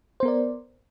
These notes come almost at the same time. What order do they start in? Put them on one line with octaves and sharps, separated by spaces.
C5 B3 A#4 D5